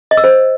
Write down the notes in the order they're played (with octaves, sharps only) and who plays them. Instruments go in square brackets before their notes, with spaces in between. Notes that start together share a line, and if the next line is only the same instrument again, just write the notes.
[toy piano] D#5
E6
C5